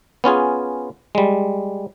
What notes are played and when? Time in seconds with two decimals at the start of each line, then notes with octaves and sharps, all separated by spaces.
0.24 B3 C#4 F4 G#4
1.15 G3 G#3